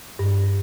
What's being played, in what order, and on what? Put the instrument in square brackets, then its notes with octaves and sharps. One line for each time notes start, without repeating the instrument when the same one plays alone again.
[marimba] G2